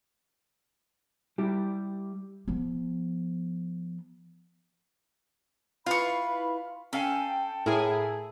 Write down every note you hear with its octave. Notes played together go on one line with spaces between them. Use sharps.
G3 E4 G4
F3 B3
E4 F4 B4 F5 B5 C#6
C#4 A4 F5 G5 G#5
A2 E4 G#4 A#4